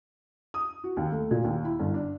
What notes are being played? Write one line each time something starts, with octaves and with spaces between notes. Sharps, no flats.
D#6
F#4
D#2
A3
A#2
D#2
E4
G1
D4